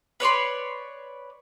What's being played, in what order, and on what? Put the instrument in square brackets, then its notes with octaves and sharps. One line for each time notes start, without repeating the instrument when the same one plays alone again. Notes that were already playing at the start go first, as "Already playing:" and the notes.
[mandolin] B4 C#5 D5 C6